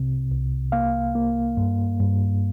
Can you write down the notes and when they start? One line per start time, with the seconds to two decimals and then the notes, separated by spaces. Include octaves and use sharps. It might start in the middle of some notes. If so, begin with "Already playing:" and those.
Already playing: C2 C3
0.31 C2
0.72 A#3 F5
1.15 A#3
1.57 G2
2.00 G2